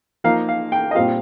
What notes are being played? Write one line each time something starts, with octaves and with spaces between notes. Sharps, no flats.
F3 A#3 D#4 F5
F5
G5
D#5
A#2 G3 C4 F4 F5